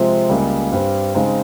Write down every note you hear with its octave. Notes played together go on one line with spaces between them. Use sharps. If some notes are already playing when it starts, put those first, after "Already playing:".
Already playing: C3 F3 G#3 C4
C#2 C#3 G3 A#3
G2 G3 C4
C#3 G#3 C4 D#4